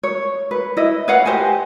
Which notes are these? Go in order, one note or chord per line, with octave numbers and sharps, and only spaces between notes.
C#5
B4
E4 D#5
B4 C#5 F5 F#5
G4 C5 D#5 G#5